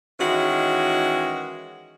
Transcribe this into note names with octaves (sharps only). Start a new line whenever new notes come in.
D#3 E3 G#3 C#4 F#4